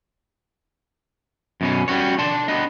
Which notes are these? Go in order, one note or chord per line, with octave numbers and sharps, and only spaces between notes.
F#2 B2 C#4
G3 C#4 F#4 C#5
D4 D5 A5 C6
B3 D4 D#5